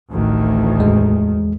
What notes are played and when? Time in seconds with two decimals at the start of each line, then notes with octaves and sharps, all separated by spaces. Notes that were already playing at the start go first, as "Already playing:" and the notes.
0.12 A1 D2 D#3
0.79 E2 G#3